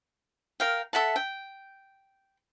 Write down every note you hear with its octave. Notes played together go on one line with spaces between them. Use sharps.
A#4 F5 G5
A4 E5 F#5 A5
G5